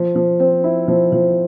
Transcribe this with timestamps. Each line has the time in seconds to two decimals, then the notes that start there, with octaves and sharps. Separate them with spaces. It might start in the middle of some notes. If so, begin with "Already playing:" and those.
Already playing: F3
0.16 F3
0.40 C4
0.64 E4
0.88 F3
1.12 F3